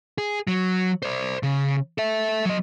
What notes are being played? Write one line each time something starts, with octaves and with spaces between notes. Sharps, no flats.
G#4
F#3
C5 D5
C#3
A4 E5
F#3 D#5